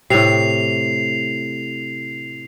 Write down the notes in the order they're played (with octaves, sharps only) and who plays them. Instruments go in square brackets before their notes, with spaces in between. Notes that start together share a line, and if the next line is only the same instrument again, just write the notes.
[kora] A2 C3 [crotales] C7 F7